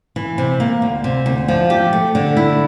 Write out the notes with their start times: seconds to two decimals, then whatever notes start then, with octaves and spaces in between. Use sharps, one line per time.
0.16 E3
0.38 C3
0.60 A#3
0.82 D2
1.04 C3
1.26 D2
1.48 F3
1.70 G4
1.93 A3
2.15 D3
2.37 E4